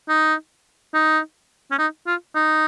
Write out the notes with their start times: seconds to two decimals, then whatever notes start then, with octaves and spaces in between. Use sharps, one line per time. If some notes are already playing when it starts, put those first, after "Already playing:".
0.09 D#4
0.94 D#4
1.71 C#4
1.79 D#4
2.06 F4
2.35 D#4